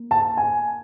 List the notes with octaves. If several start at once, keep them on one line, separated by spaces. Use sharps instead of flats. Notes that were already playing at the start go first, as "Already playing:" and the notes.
Already playing: A#3
A5
G#5